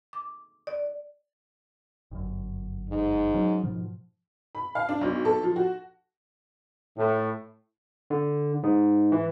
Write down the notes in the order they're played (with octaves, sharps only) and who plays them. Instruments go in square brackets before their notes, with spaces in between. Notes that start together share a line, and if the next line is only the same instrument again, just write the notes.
[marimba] D6
D5
[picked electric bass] G1 F#2
[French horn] G#2
[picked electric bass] F#3 C#4
G#2 B2 F3
[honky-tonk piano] B5
F5
D4
B1
A4
F3
F#4
[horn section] A2
[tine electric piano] D3
G#2
E3